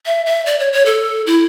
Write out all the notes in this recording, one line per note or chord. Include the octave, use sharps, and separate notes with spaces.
E5
E5
D5
C#5
C#5
A4
E4